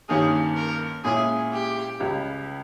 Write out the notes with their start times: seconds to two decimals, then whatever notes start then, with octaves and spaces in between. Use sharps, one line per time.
0.08 G2 D#3 G3 A#3 C#4 G#4
0.56 A#4
1.04 A#2 G#3 C#4 E4 G#4
1.52 G4
1.99 C#2 C#3 G3